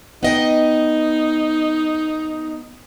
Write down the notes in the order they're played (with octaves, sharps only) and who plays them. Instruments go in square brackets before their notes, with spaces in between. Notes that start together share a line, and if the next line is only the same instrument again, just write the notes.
[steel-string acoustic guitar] B3 D#5 G5 [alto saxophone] D#4